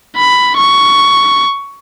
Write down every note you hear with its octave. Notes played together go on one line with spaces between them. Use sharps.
B5
C#6